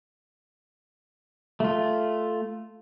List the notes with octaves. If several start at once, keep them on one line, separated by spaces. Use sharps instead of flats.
A3 F4